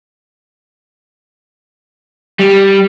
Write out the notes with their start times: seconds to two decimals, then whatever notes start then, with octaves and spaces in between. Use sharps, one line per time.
2.39 G3